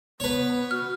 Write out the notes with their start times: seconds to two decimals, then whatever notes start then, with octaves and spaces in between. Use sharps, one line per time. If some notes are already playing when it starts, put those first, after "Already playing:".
0.20 B3 B4 C#5
0.71 F#4 F6